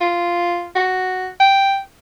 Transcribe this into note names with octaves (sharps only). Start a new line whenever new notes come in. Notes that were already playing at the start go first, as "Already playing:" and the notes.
F4
F#4
G5